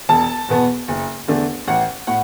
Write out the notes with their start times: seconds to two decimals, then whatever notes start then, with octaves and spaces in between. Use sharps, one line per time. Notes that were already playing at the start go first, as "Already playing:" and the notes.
0.09 E1 A5
0.49 E2 B2 B3
0.88 F#1
1.28 E2 D3 A3 D4
1.68 A1 F#5
2.07 A2 F#5